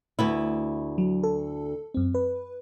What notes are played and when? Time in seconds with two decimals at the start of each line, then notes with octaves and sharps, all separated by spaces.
0.19 D2 B3 E4
0.98 F#3
1.23 A4
1.94 F#2 C4
2.15 B4